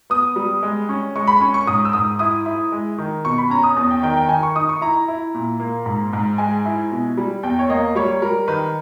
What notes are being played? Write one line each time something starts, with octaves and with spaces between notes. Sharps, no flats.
B3 D#6
G3
G#3
C#4
G#3 C#6
B5
C#4 C#6
C#6
G#2 D#6
E6
G#2 D#6
E4 D#6
E4
G#3
D#3
B2 C#6
B5
C#4 A#5
D#6
E2 D#6
G5
D#3 G5
G5
D#3 G#5
C#6
D#4 D#6
C#6
E4 A#5
E4
A#2
A#3
G#2
G#2
G#3 G#5
E4
B2
G3
E2 G5
C#5
A#3 D#5
G3 C#5
G3 A#4
D#3 B4